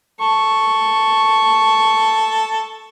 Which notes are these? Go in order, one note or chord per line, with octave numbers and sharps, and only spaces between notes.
A4 C#6